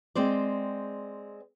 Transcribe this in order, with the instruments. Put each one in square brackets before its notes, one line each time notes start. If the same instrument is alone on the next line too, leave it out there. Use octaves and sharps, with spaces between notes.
[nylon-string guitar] G#3 C4 C5 D5